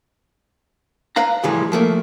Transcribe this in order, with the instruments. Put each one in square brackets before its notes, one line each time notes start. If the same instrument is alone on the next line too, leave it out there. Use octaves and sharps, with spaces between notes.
[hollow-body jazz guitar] B4 F5 A#5
A2 C#3 E3 F3 G3 G#3
F3 A3 A#3